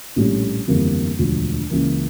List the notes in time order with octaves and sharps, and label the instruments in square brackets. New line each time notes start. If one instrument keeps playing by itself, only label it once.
[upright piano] A#1 A2 G3 C#4
G1 F2 E3 G3 A#3
E1 D2 D3 F3
C#2 C#3 E3 A#3